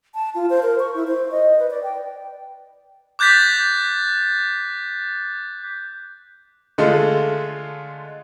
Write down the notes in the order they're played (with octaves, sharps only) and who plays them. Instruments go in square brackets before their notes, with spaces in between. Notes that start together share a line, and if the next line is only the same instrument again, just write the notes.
[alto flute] A5
F4
C5
A#4
C#6
E4
C5
D#5
B4
D5
G5
[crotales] D6 F#6 G6 A6 B6
[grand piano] D3 G#3 A3 F4